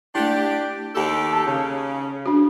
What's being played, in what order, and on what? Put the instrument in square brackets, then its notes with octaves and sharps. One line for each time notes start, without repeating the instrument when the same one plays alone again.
[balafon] A3 E4 [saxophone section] D4 G4
[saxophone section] D#2 G4 A4
[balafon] A5
[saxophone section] C#3
[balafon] D4 F#4